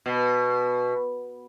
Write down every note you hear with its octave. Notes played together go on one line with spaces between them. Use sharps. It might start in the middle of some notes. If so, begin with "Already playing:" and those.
B2